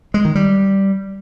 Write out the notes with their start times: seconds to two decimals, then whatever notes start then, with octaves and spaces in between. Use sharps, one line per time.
0.14 G#3
0.25 D#3
0.35 G3